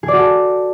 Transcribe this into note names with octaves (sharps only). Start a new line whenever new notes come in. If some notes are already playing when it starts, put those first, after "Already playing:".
G#4
D5
F#4
A4